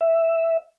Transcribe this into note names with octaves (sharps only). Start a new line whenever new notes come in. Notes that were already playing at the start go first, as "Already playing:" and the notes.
E5